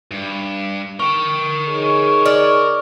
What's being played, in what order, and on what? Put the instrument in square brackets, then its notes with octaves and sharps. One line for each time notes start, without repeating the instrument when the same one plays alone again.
[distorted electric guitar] G2
[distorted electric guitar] A#4 G5 [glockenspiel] C#6
[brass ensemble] D#4 G#4 C#5
[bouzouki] D5 [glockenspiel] C#6 F6